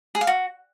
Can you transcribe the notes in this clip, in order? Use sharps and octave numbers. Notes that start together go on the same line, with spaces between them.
G#4
F5
F#4